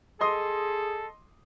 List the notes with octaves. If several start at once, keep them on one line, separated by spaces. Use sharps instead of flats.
G#4 A4 D#5 C6 D#6